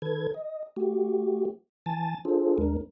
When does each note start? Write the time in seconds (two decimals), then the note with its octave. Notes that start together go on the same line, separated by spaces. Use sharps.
0.02 D#3 A4 B4 G#6
0.34 D#5
0.76 A3 F#4 G4
1.86 E3 G#5 A5 A6
2.25 D4 F4 G#4 A4 C5
2.58 D#2 G#3 D4 A#4